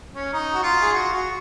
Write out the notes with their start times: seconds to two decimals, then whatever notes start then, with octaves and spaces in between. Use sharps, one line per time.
0.14 C#4
0.33 D#4
0.54 F#4
0.63 F4
0.82 G#4
0.93 F#4
1.13 F#4